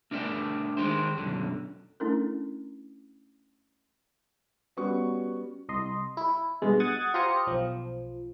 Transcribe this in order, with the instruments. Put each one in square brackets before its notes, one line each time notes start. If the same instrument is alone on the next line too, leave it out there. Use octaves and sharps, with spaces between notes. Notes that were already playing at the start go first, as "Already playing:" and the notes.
[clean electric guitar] A3 D4 A#4 D5 E5 G5
D#3 G#3 G4 C5
B1 F#2 D3
[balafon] A3 C#4 D4 E4 A4 A#4
[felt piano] G3 B3 C#4 F#4 B4 C#6
[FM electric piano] C2 D#5 C6
E4
G2 B2 G#3
F#5 D#6 G#6 A6
F4 G4 C5 A#5 D#6 C#7
B1 F3